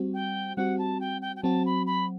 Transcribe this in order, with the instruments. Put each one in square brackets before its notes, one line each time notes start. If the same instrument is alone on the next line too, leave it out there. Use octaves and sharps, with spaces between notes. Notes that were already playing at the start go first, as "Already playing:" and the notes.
Already playing: [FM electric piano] G3 C4 F#4
[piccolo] G5
[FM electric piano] G3 C4 F#4 [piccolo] F#5
[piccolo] A5
G5
G5
G5
[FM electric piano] F#3 C4 F#4 [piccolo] A5
[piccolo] B5
B5